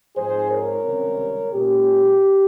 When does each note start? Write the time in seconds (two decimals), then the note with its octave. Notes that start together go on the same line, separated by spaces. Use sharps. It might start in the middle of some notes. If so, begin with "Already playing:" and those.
0.16 G#2 F3 C4 D#4 G#4 C5
0.50 A#4 C#5
0.85 C#2 C3 D#3 G3 C4
1.53 A#2 G#3 C#4 G4